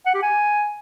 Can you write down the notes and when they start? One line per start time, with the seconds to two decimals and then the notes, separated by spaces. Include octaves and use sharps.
0.06 F#5
0.14 G4
0.22 G#5